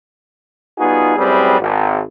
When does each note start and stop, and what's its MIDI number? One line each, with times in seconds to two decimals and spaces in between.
0.79 1.14 55
0.79 1.14 59
0.79 1.14 63
0.79 1.14 65
0.79 1.14 66
0.79 1.14 68
1.17 1.56 42
1.17 1.56 45
1.17 1.56 55
1.17 1.56 60
1.17 1.56 68
1.17 1.56 71
1.60 2.01 32